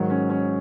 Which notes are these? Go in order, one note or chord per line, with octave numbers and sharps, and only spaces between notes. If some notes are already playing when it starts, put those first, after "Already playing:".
Already playing: G#2 D#3 F#3
C#4
C#4